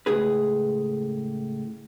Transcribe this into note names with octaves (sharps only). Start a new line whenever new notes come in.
C#2 A2 G#4 B4